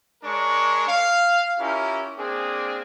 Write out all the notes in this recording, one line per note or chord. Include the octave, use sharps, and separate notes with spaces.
G#3 D4 A#4 C#5 C#6
F5
C#4 E4 F4 G4 A#4
A#3 C4 D4 G#4